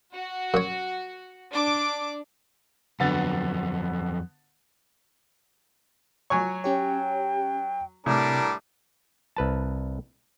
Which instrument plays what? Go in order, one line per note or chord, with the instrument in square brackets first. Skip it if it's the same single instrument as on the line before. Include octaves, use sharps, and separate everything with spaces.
[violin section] F#4
[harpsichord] F#2 C#5
[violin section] D4 D6
[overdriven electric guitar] F2 F#3 [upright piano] D3 B3 A6
[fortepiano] F#3 G#5 C#6 [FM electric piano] C#5
[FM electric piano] C#4 G4 C#5 [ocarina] G5
[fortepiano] A2 [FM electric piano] C3 [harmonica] G3 D4 A#4
[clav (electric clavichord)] C2 B4 A5